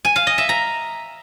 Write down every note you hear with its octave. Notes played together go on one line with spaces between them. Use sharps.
G#5
F5
D#5
E5
A#5